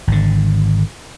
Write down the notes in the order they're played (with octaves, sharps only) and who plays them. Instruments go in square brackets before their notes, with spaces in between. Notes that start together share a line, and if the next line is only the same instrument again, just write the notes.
[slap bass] G#1 D3